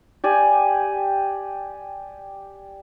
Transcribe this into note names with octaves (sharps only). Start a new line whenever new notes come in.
G4 D5 G#5